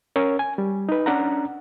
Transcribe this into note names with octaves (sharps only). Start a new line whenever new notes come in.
C#4 A#4 C#5
G#5
G3
D#4 B4
C#4 D4 F#5 A#5